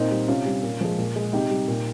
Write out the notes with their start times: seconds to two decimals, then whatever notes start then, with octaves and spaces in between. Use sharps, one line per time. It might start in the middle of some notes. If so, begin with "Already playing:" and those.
Already playing: A#2 C4 D#4
0.11 G3
0.28 C3 C#4 F4
0.46 G3
0.63 A#2
0.81 F3 G#3
0.98 A#2
1.16 G#3
1.33 C3 D#4 G4
1.51 G3
1.68 A#2